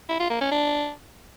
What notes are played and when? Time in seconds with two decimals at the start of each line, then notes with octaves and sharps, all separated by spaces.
0.09 E4
0.20 F4
0.30 A#3
0.41 C#4
0.51 D4